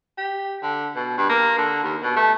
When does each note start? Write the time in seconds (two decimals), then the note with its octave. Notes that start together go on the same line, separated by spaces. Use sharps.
0.18 G4
0.63 D3
0.96 B2
1.18 G2
1.30 A#3
1.58 D3
1.83 D#2
2.03 B2
2.16 A3